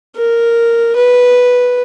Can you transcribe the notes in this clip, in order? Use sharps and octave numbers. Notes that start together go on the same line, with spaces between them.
A#4
B4